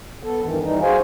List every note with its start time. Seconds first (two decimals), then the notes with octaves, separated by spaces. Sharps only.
0.23 B3 A4
0.41 G2 D#3 E3
0.62 E3 G3 D#4
0.81 F#4 G#4 C5 F5 G#5